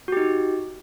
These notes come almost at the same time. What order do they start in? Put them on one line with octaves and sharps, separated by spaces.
F#4 G4 D#4